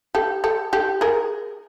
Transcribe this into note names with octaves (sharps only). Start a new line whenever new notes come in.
G4 A4
G4 A4
G4 A4
G#4 A#4